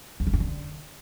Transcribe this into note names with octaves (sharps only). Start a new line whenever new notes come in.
E2
E3
G2
D3